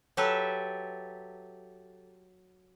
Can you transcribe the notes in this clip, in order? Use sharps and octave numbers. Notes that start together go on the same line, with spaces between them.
F#3 G4 A4 B4 E5